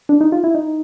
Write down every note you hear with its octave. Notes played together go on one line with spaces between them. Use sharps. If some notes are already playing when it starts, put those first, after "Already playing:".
D4
D#4
F4
E4
D#4